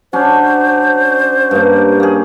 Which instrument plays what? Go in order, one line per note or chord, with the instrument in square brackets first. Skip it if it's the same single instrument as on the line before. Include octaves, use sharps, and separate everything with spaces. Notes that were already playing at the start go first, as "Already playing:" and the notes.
[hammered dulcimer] F#3 C#4 D4 [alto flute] C5
[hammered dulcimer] G2 A#3
A#3 G#4